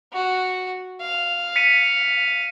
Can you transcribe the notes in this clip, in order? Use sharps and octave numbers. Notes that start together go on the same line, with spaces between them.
F#4
F5
B6 C#7 D#7